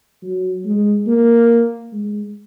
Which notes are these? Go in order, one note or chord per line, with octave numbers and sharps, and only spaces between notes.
F#3
G#3
A#3
G#3